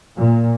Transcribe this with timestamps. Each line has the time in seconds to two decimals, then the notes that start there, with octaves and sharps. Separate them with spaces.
0.17 A#2